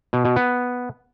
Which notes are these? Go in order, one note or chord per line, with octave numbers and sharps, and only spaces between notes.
B2
B2
B3